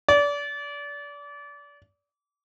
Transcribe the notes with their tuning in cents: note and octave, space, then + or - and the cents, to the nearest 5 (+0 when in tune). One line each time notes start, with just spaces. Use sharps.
D5 -30